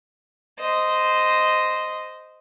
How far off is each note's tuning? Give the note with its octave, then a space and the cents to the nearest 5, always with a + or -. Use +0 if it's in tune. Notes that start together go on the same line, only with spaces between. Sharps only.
C5 -10 D#5 +0